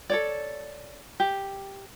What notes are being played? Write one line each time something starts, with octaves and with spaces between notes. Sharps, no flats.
A4 C#5 D5
G4